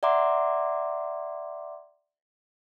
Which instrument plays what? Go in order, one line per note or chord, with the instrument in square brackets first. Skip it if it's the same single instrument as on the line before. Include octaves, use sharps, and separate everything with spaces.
[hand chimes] D5 E5 F#5 A#5 C6 D6